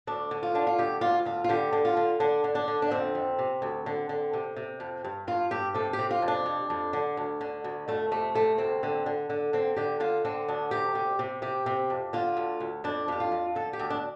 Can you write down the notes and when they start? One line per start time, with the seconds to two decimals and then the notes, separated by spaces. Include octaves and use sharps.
0.07 D2 D4
0.31 D3
0.43 F4
0.54 D3 D4
0.67 F4
0.78 D2 G4
1.01 D2 F4
1.25 D2 F4
1.44 F4
1.49 D3 G4
1.73 D3
1.85 F4
1.97 D3
2.20 D3 D4
2.44 D3
2.55 D4
2.68 D3
2.82 D4
2.91 F2 C4
3.15 F2
3.39 C3
3.62 D2
3.86 D3
4.09 D3
4.33 C3
4.56 C3
4.80 F2
5.04 G2
5.27 G2 F4
5.51 G2 G4
5.74 C3 A4
5.93 G4
5.99 C3
6.11 F4
6.22 F2
6.28 D4
6.46 F2
6.70 F2
6.93 D3
7.17 D2
7.41 D3
7.64 D2
7.88 F2 A3
8.11 C3 A3
8.35 C3 A3
8.58 D2 C4
8.83 D3
9.06 D3
9.30 D3
9.53 D3 C4
9.76 D3 G4
10.00 D3 F4
10.25 D3 C4
10.48 D2 D4
10.71 C3 G4
10.95 C3
11.19 C3
11.42 C3 G4
11.66 C3
11.90 F2
12.13 D3 F4
12.37 D2
12.60 D2
12.84 F2 D4
13.08 F2 G4
13.20 F4
13.32 F2
13.55 D3 A4
13.73 G4
13.79 D2
13.90 D4